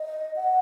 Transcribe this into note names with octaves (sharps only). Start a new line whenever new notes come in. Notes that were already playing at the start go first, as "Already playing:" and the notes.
Already playing: D#5
F#5